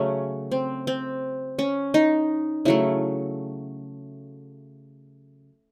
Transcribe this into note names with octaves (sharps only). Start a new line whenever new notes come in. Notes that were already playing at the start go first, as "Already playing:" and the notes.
Already playing: C#3 F#3 A3 C#4
C4
C4
C#4
D#4
C#3 F#3 A3 E4